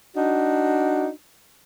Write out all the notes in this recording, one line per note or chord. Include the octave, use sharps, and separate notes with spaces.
D4 D#4 F#4